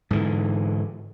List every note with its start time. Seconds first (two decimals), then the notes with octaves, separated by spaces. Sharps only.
0.11 G#2 D3 E3